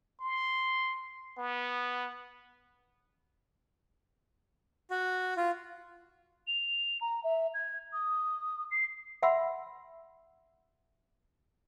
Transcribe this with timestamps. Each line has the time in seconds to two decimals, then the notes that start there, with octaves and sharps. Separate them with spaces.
0.21 C6
1.38 B3
4.90 F#4
5.37 F4
6.47 F7
7.01 A#5
7.24 E5
7.54 G#6
7.93 D#6
8.71 C7
9.23 E5 F#5 B5 C6 E6